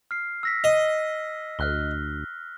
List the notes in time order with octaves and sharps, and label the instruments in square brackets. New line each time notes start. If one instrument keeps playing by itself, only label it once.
[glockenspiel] F6 C7
E6 A#6 B6
[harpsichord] D#5
[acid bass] D2 [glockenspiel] F6 F#6 G7